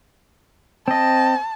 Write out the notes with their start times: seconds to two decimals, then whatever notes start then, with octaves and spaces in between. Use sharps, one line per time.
0.88 C4 D#5 A5